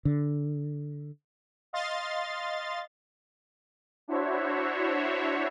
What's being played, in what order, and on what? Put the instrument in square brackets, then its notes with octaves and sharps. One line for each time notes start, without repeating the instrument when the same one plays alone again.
[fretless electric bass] D3
[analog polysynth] D#5 F5 C6 A6
[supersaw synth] D4 E4 F#4 C5 C#5 E5